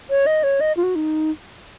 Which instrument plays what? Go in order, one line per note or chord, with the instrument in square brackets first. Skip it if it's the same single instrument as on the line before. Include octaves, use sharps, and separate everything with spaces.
[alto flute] C#5
D#5
C#5
D#5
F4
F#4
D#4